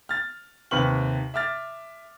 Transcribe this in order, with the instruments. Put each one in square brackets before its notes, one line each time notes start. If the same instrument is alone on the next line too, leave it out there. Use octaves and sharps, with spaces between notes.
[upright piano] F6 A6
D#2 C3 B4 C#6 F6 F#7
E5 D6 F6 A6